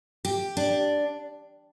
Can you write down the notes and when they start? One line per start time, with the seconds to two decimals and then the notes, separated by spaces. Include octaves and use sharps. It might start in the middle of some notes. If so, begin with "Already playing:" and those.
0.25 G4
0.57 D4